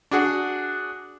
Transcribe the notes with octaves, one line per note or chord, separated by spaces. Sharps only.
D4 F#4 G#4 F#5